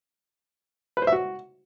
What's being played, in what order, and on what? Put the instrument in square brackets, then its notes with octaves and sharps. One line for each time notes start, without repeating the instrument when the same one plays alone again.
[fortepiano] B4
C5
E5
F#4